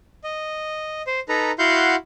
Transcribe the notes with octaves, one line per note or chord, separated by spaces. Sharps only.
D#5
C5
D#4 A4 B4 A#5
E4 F#4 F5 F#5 C6 G6